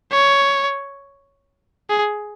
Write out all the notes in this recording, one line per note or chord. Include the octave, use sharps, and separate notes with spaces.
C#5
G#4